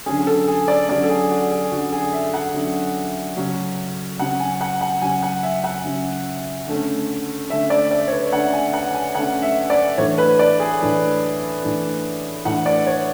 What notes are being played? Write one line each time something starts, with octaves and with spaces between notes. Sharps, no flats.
D3 F#3 C#4 G#4
A4
G#4
D5
D3 F#3 C#4 D5
A4
G#4
F#4
G#4
D3 F#3 C#4 F#4
G#4
E5
F#5
D3 F#3 C#4
C#3 F#3 C#4
C#3 F#3 C#4 F#5
G#5
F#5
F#5
C#3 F#3 C#4 G#5
F#5
E5
F#5
C#3 F#3 C#4
D3 A3 C#4
D3 A3 C#4 E5
D5
D5
C#5
B4
D3 A3 C#4 F#5
G#5
F#5
G#5
D3 A3 C#4 F#5
E5
D5
A2 E3 A3 D4 C#5
B4
D5
G#4
A2 E3 A3 D4
A2 E3 A3 D4
A2 E3 A3 D4 F#5
D5
C#5